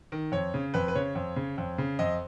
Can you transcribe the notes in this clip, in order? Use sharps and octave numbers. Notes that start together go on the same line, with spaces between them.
D#3
F2 C#5
C#3
F2 B4
B4
C#3 C#5
F2
C#3
F2
C#3
F2 D#5